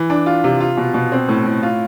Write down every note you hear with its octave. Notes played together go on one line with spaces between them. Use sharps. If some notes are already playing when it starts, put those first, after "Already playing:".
Already playing: E3
D4
F4
C3
F4
B2
B2
C4
A2
A2
F4